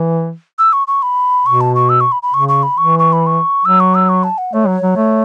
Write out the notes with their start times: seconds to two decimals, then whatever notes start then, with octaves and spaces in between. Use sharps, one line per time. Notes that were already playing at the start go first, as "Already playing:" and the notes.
Already playing: E3
0.59 E6
0.73 C#6
0.88 C#6
1.02 B5
1.46 B2 C#6
1.61 A5
1.75 C#6
1.89 E6
2.01 C#6
2.12 B5
2.23 B5
2.34 C#3 C#6
2.49 C#6
2.63 B5
2.78 E3 C#6
2.99 C#6
3.13 B5
3.26 C#6
3.65 F#3 E6
3.80 C#6
3.95 E6
4.09 C#6
4.24 A5
4.38 F#5
4.53 A3 C#5
4.67 F#3
4.82 F#3
4.96 A3